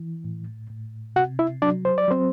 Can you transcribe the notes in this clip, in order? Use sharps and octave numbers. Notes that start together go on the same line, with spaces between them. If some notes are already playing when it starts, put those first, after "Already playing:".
Already playing: E3
A2
A2
C3 F#4 F#5
E4 E5
F#3 D4 D5
C5
D5
F#3 C4 C5